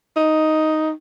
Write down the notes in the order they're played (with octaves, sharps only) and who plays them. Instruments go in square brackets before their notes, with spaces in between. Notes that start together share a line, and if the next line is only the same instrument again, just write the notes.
[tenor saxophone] D#4